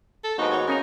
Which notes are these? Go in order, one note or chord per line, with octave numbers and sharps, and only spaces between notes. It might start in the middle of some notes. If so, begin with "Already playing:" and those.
A4
D#2 G#2 B3 D#4 F#4
C#5 F#5
C#3 C#4 D#4 A#4 A#5